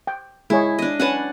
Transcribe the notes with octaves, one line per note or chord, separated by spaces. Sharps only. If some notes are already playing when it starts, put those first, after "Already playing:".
G5
G#3 E4 G#4 C#5
D4 D#5
C#4 B4 F#5 G#5 A5